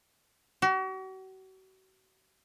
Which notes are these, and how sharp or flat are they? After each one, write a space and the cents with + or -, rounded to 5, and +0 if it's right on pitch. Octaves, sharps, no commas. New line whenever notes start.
F#4 +40